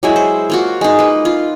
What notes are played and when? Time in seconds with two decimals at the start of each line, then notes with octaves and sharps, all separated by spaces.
0.03 F#3 G#3 E4
0.16 C5
0.50 A#3 F4 F#4
0.81 G#3 D#4
0.99 A#3 B4
1.25 F4